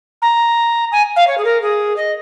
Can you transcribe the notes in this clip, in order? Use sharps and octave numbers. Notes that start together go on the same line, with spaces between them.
A#5
G#5
F5
C#5
G#4
A#4
G#4
D#5